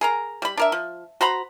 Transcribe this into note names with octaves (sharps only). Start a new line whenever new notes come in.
G#4 A#4 A#5
G3 B5
D4 A#4 E5
F3
F#4 C5 A#5 B5